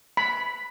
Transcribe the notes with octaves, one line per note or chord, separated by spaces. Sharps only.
B5